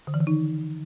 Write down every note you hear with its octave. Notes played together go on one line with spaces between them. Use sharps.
D3
E3
D#3
D#4